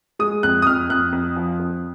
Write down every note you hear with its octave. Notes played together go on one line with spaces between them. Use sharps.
G#3 D#6
F2 F#6
D#6
F2 F6
F2 F#6
F2
F3
F2